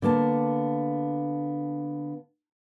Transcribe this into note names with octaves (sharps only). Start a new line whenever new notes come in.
D3 A#3 B3 A5